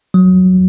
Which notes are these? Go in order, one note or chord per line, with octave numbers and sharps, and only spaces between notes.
F#3